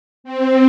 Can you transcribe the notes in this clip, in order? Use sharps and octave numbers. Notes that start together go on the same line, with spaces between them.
C4